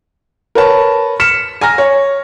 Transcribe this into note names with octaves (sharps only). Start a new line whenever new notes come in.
A#4 B4 C#5 A5
F6 B6 C#7 E7
G#5 A#5 F6 A#6
C#5